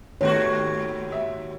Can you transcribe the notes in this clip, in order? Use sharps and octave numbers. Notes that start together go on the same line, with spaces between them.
D#2 G#2 D#3 A3 B3 F#4 C#5
E5